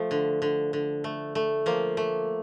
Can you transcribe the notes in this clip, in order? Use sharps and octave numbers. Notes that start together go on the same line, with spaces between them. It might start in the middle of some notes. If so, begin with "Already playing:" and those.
Already playing: F3 A3
D3
D3
D3
A3
A3
F3 A#3
A3